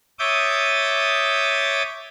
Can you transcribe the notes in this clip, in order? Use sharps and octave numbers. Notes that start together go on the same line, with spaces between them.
C#5 E5 D6 D#6 G6 A6